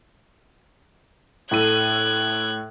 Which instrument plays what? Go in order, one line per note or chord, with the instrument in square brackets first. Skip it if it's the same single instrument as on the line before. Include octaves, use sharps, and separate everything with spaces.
[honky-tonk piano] A2 A4 D#7 [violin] F#6 G#6